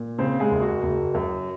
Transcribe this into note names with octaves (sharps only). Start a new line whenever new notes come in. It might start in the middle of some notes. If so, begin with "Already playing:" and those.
Already playing: A#2
C#3 C4 C5
G#3 G#4
F#1
F#4
F#1
F#2